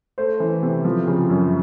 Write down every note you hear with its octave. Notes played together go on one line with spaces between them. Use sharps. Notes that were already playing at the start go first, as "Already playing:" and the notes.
A3 C5
E3
C3
F3
C#3
F#2